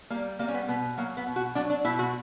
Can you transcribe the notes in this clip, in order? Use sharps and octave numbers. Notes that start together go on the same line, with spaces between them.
G3 A#3
G3 A#3
C#4
B3
B2 B3
F#3 A#3
B3
B2
F#4
F#3 D4
D4
B2 E4
F#4